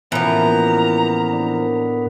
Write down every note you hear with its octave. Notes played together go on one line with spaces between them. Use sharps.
A2 E3 F3 A#3 B3 C#4 A#5
D4 A#4